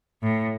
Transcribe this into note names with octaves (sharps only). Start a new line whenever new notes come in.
A2